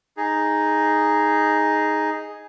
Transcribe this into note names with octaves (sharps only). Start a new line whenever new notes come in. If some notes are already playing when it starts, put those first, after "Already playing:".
D#4 G#4